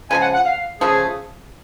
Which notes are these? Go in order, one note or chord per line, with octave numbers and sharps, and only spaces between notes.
C#3 F3 G#3 G#5
F#5
F#5
F5
C#3 F3 A3 G#4